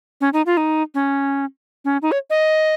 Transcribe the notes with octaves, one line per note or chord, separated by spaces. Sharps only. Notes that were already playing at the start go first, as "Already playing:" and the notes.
C#4
D#4
F4
D#4
C#4
C#4
D#4
C#5
D#5